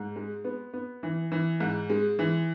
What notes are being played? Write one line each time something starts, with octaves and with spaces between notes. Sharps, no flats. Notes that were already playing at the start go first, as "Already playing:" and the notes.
Already playing: G#2
G#3
B3
B3
E3
E3
G#2
G#3
E3